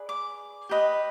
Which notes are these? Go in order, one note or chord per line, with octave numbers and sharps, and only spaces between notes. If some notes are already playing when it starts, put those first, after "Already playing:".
Already playing: G#4 B4 D5
D6
G4 B4 D#5